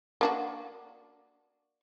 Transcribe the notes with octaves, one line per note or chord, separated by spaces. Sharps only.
A#3 D4 F#4